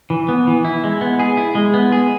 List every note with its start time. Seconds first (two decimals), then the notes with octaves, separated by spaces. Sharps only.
0.10 E3
0.29 B3
0.47 E3
0.65 E4
0.84 G#3
1.01 B3
1.19 G#4
1.37 E4
1.55 G#3
1.74 B3
1.92 G#4